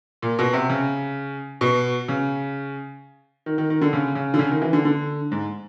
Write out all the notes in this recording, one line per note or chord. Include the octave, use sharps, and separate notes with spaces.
A#2
B2
C3
C#3
B2
C#3
D#3
D#3
D#3
D3
C#3
C#3
D3
C#3
D#3
E3
D3
D3
G#2